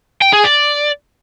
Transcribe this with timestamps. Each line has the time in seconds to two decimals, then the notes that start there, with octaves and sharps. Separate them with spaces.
0.22 G5
0.33 G#4
0.44 D5